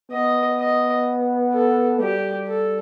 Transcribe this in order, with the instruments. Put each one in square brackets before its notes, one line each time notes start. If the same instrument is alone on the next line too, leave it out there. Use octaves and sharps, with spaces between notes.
[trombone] B3 [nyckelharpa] D#5
[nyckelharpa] D#5
A4
[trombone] G3 [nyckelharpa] G4
[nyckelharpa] A4